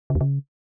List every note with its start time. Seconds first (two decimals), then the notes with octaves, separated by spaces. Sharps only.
0.10 C#3
0.15 E2
0.21 C#3